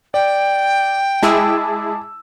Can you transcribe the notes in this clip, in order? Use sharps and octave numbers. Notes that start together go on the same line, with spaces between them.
D5 G5
G#3 E4 G#4 A5 D6 E6